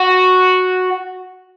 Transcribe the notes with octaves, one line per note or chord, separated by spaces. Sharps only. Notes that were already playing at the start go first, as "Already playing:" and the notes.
Already playing: F#4